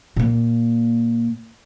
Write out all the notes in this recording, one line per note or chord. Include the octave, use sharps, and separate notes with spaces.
A#2 A#3